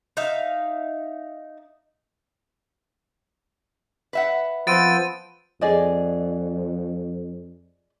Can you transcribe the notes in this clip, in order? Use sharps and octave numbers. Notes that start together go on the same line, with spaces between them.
D#4 E5 F5
B4 E5 F#5
F3 B3 C4 A6 D7 D#7
F2 G#4 D5 D#5